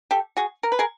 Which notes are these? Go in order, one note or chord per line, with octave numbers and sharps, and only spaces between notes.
G4 A4
F#4 G#4
A#4
B4
G#4 A#4